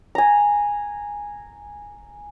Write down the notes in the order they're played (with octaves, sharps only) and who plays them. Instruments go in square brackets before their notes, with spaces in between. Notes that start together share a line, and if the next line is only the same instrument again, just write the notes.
[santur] G#5 A#5